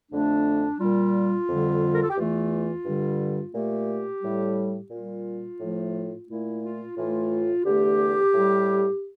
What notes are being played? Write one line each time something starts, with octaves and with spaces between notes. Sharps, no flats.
F2 D3 A3 D4
A#2 G3 F4
F2 D3 G3
A#4
A4
G4
E2 E3 A3 F4
G2 D3 G3
A#2 A3 G4
A2 G3
A#2 G3 F4
A2 F3 A3
A#2 A3 E4
F4
A2 E3 A3 F4
E2 D3 A3 G4
A2 G3